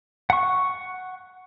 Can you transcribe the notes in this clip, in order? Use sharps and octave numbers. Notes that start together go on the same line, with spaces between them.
F#5 C#6